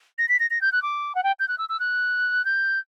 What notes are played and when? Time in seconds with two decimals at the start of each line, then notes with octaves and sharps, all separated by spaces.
0.18 A#6
0.28 B6
0.39 A#6
0.50 A#6
0.61 G6
0.72 F#6
0.82 D6
1.15 F#5
1.23 G5
1.39 G6
1.48 F#6
1.58 E6
1.69 E6
1.80 F#6
2.45 G6